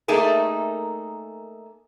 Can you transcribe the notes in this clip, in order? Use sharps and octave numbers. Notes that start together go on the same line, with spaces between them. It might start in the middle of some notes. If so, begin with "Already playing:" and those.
A3 A#3 D#4 G#4 A#4